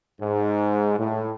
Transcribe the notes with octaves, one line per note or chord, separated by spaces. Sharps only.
G#2
A2